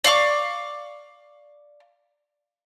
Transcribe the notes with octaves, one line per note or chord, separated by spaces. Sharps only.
D5 F5 C#6 D6